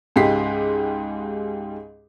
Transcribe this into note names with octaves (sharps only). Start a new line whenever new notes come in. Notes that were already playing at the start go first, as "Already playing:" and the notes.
C#2 G#2 G#3 G4 B6 C7